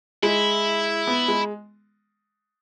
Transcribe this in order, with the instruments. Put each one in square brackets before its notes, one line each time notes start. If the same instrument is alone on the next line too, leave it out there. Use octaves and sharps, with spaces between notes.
[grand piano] G#3 [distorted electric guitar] E4
[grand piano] B3
G#3